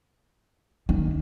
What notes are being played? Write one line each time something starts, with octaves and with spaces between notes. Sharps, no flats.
D#3